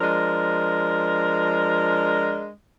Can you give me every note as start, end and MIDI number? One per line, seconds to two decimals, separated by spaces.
0.01 2.49 53
0.01 2.49 56
0.01 2.49 62
0.01 2.49 70